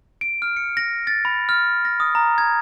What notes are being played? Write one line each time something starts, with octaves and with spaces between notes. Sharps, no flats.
D7
F6
C#7
A#6
A6
B5
F6
A#6
D#6
A#5
G#6